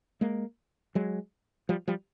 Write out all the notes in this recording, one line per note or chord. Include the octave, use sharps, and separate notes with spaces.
G#3 A#3
F#3 G#3
F3 G3
F3 G3